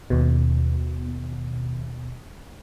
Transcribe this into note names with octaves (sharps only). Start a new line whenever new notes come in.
D#2 B2